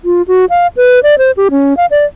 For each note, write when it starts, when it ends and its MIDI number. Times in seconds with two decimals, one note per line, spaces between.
0.05 0.22 65
0.28 0.45 66
0.50 0.67 77
0.76 1.00 71
1.03 1.18 74
1.18 1.31 72
1.37 1.48 67
1.51 1.76 61
1.77 1.86 77
1.91 2.05 74